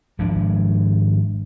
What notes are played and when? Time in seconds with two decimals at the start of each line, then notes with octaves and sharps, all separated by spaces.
0.19 G#1 F3 G#3 D4